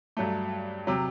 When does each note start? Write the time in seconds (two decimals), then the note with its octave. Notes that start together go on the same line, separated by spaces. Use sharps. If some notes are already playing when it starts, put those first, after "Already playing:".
0.17 G2 F#3 A3
0.87 C3 F#3